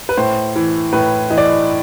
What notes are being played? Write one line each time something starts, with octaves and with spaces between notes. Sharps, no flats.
B4
A2 C5
E3
A2 B4
E3 D#5
D5
D#5